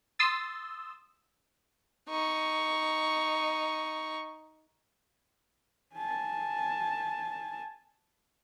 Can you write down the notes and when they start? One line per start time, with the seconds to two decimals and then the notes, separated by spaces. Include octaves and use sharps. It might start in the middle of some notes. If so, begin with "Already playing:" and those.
0.19 C6 D#6 E6 A6
2.09 D#4 C#6
5.95 G#5 A5